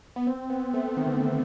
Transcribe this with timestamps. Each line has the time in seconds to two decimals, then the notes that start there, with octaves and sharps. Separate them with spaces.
0.16 B3
0.27 C4
0.50 B3
0.74 A3
0.97 D#3
1.06 D3
1.15 D#3